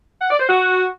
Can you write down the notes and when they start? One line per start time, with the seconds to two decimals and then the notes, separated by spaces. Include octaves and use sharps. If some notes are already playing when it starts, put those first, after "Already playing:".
0.21 F#5
0.30 D5
0.39 C5
0.48 F#4